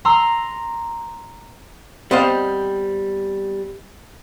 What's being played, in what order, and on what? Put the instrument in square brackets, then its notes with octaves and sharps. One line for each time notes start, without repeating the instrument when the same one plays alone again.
[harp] A#5 C6 E6
[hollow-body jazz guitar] G3 B3 C4 C5 D#5 F5